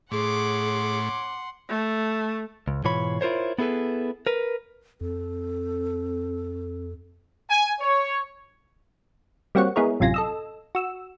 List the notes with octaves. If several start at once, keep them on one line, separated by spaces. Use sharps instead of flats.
A2 C#4 G#4 C#5 F#5 C6 D6
A3
C#2
G#2 B2 E3 F4 C#5 B5
E4 F4 A#4 C5 C#5
B3 E4 G#4 A4 B4
A#4 B4
F2 C4 A4
G#5
C#5
G3 A#3 C4 F#4 C#5 F#5
G#3 B3 E4 G#4 A#4 C#5
A1 F#2 C3 F4 G#5 A#6
A4 D#5 E6
F#4 E6